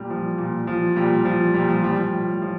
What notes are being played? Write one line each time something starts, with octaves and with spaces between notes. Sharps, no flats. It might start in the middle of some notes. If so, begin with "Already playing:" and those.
Already playing: A#2 G3
F3
A#2
F3
A#2 G3
F3
A#2 G3
F3
F3 G3
G3
A2
F3